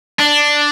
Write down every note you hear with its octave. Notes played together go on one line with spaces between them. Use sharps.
D4